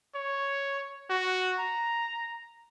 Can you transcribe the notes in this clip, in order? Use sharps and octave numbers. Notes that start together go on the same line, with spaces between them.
C#5
F#4
A#5